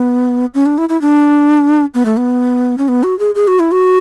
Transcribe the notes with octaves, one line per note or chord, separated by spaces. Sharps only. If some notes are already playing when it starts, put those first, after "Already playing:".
Already playing: B3
C#4
D4
E4
E4
D4
B3
A3
B3
C#4
B3
F#4
G#4
G#4
F#4
E4
F#4